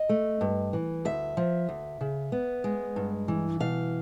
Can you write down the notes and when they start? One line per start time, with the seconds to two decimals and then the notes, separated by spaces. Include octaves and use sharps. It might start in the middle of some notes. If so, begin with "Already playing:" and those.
Already playing: D#5
0.09 A3
0.41 G2
0.73 E3
1.05 D2 E5
1.37 F3
1.69 D2
2.01 C#3
2.32 B3
2.64 G#3
2.96 G2
3.28 E3
3.60 B2 F5